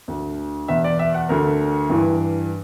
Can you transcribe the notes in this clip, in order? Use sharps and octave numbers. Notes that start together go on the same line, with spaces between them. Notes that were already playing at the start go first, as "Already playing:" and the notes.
D2 D3
E2 B2 E5
D5
E5
F#5
D2 D3 A#4
G2 E3